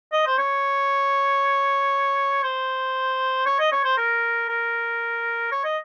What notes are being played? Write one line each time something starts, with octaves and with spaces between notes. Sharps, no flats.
D#5
C5
C#5
C5
C#5
D#5
C#5
C5
A#4
A#4
C#5
D#5